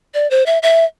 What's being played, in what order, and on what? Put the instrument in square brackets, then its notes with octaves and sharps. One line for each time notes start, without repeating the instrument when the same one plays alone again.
[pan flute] D5
C5
E5
E5